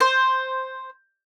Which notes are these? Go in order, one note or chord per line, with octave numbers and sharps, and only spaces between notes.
C5